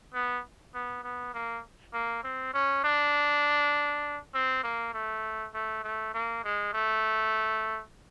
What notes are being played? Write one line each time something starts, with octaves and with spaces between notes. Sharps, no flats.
B3
B3
B3
A#3
A#3
C4
C#4
D4
C4
A#3
A3
A3
A3
A#3
G#3
A3